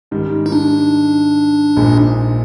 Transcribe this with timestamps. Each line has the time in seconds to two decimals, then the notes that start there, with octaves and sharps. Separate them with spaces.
0.11 G#2 D#3 G3
0.46 D#4
0.52 D4
1.76 A#1 A#2 G#3 D#4